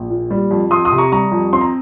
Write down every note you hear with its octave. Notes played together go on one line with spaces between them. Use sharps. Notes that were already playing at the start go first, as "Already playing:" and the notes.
Already playing: A#1
A#2
G3
F2
F2 C6 D#6
C6 D#6
C3
A#5 C#6
G3 A#5 C#6
F2
C4 C6
A#5